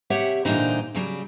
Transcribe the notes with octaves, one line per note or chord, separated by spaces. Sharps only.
C3 G4 C#5 E5 F#5
A#2 D3 E3 G3 D#4 C5
C#3 F#3 G3